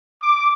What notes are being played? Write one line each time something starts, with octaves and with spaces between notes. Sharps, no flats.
D6